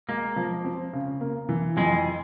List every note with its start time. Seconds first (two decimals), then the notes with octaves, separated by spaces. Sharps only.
0.08 G#3 A#3
0.36 F3
0.64 C4
0.93 C#3
1.21 A#3
1.49 E3
1.77 F2 G#3